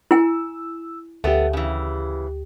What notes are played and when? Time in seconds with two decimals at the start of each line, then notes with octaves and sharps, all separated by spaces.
0.11 E4 G#5 E6
1.24 D2 A3 B3 G4
1.53 C#3 E3